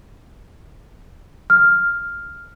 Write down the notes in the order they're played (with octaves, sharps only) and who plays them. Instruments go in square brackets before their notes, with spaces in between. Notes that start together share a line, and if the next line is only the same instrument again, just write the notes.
[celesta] F6